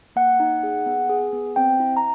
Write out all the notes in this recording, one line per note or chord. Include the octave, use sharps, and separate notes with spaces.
A#3 F#5
D#4
G#4
B3
G#4
B3
C4 G5
E4
A#5